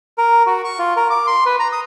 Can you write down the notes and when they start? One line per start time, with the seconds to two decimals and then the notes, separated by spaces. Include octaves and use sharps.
0.18 A#4
0.47 F#4
0.65 C#6
0.79 F4
0.97 A#4
1.10 D6
1.27 C6
1.46 B4
1.59 A#5
1.72 D#6